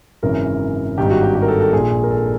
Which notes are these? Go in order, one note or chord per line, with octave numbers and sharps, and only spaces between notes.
G#1 F#2 C#3 E3 A#4
G#1 G2 D#3 G4
F#4
G4
G4
A#4
A4
A4
A#1 A#2 G#4
A#4
A4